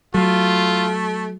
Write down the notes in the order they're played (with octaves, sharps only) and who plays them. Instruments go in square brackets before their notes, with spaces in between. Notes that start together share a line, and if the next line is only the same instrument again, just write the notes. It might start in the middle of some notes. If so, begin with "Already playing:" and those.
[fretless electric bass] F#3 [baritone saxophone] A3 [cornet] F4